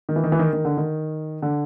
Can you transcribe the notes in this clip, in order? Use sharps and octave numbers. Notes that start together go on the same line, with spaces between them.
D#3
E3
D#3
E3
D#3
D#3
D3
D#3
D3